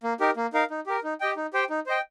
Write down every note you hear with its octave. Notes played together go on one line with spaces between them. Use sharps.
A#3
D#4 G4 A#4
A#3
D#4 A#4 F5
D#4
G4 A#4
D#4
G4 D#5 G5
D#4
G4 C5 G5
D#4
C5 D#5 G5